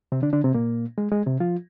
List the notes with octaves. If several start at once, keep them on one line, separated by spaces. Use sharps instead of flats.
C3 C4
D3 D4
D3 D4
C3 C4
A#2 A#3
G#3
G#3
C3 C4
F3 F4